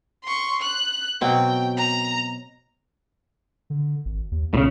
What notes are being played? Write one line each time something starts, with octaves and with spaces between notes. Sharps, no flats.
C6 C#6
F#6
B2 F#3 C4 G5
A#5
D3
G#1
D#2
C#2 A2 C#3